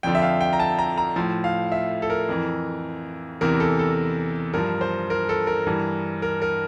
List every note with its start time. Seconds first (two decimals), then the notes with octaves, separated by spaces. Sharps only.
0.03 F2 D3 F3 G5
0.15 E5
0.22 F5
0.41 G5
0.53 A#5
0.60 A5
0.79 A#5
0.97 A#5
1.16 A2 F3
1.44 F5
1.72 E5
2.02 A4
2.10 A#4
2.29 F2 E3
3.41 E2 C3 E3 A#4
3.60 A4
3.79 A4
4.53 G2 F3 A#4
4.81 C5
5.10 A#4
5.29 A4
5.47 A#4
5.66 G2 E3
6.22 A#4
6.42 A#4